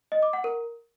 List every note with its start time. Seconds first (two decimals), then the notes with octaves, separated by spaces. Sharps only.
0.12 D#5
0.23 D6
0.33 F#5
0.44 A#4